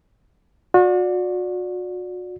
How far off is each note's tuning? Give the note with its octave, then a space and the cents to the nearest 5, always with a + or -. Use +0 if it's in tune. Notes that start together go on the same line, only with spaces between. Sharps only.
F#4 -40 D5 -5